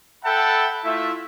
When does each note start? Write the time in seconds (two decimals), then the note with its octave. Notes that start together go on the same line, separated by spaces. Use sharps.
0.25 A4 E5 F#5 G5 A5 B5
0.83 A3 E4 F4 E5